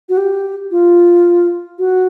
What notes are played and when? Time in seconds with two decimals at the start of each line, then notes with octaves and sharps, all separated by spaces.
0.09 F#4
0.17 G4
0.71 F4
1.79 F#4